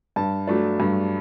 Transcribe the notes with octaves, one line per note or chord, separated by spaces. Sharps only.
G2 A5
F#3 A3 D4
G2